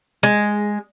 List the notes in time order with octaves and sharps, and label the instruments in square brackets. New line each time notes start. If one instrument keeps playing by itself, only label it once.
[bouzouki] G#3